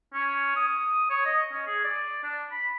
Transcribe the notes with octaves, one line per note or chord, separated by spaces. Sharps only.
C#4
D#6
C#5
D#5
C#4
G#4
D5
D4
B5